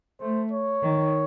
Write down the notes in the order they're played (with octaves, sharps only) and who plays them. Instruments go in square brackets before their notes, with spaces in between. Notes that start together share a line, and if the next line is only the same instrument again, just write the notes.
[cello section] A3 [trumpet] C5
[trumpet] C#5
[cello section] D#3